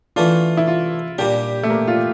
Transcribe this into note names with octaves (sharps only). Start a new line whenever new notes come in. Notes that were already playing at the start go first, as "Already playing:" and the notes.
E3 A3 D4 F4
E4
F4
A#2 G3 D4 G4
A3
A#3
F4